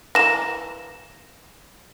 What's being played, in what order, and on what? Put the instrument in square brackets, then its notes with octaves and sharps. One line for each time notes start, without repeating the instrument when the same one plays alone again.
[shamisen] E3 A3 A#3 [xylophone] A#6 E7